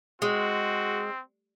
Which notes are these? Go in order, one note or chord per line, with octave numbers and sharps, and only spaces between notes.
G#3 C4 F#4